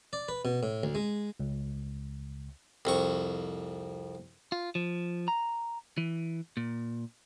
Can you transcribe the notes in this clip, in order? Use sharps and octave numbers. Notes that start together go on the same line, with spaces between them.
D5
B4
B2
A2
D2
G#3
C#2
C2 F2 C#6
F4
F3
A#5
E3
A#2